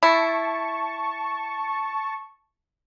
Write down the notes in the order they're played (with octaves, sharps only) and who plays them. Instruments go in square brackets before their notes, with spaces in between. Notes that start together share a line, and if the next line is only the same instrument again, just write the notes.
[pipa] E4 [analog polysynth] A5 C#6